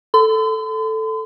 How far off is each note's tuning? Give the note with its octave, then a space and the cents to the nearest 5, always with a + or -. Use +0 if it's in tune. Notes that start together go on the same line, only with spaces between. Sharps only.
A4 +0 C6 -45